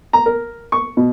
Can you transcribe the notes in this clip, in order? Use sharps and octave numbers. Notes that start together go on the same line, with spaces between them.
A#5
A#4
C#6
B2